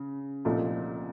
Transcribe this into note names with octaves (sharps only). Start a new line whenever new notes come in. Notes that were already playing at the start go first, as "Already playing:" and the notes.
Already playing: C#3
C2 A#2 F3 A3 D#4